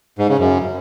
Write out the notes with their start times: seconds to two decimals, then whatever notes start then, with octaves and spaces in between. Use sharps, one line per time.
0.19 G#2
0.29 C#3
0.39 F#2